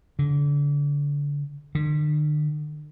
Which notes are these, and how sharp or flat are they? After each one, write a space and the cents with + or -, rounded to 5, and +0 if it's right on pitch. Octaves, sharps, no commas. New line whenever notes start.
D3 -30
D3 +45